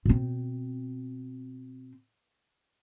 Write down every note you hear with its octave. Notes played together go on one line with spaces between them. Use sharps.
B2 C4